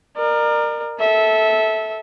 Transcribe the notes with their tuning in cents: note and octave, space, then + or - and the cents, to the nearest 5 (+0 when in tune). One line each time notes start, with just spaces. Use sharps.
A#4 +0 D5 +40
A4 -10 E5 -20